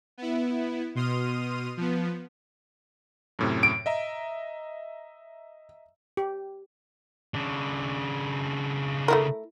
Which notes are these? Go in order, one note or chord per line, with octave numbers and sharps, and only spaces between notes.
B3 E4
B2 C6 D#6 F6 D#7
F3 B3
F#2 A2 C3
D7
D#5 E5 A#5
G4
C#3 D4
A3 E4 A#4